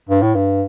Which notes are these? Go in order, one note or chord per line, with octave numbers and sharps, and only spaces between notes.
G2
A2
G2